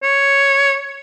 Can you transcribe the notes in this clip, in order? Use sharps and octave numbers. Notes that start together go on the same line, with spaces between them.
C#5